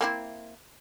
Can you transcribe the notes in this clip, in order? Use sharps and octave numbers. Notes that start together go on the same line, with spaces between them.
A#3 C4 E4